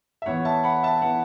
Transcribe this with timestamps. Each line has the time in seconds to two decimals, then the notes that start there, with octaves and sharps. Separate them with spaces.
0.22 E5
0.26 E2 E3 B3 C#5 F#5
0.45 E5 A5
0.64 F#5 B5
0.83 E5 A5
1.02 E3 B3 F#5